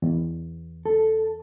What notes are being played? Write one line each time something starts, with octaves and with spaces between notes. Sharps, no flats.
E2
A4